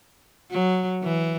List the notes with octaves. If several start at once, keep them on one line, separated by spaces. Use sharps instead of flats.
F#3
E3